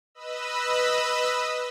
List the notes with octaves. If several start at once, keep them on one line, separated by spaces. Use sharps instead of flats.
B4 D#5 B5 E6